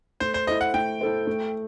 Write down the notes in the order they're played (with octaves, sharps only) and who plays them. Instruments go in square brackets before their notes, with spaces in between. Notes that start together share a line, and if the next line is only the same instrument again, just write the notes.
[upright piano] A3 [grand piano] C5
[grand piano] C5
[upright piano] E4 A4 C5 [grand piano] D#5
[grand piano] F#5
[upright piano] A3 [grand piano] G5
[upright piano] E4 A4 C5
A3